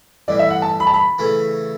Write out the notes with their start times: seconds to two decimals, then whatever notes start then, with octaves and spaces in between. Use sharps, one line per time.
0.28 A1 G2 E3 D5
0.39 E5
0.50 F#5
0.62 A5
0.80 B5
0.87 A5
0.94 B5
1.18 C#3 E3 A3 C#4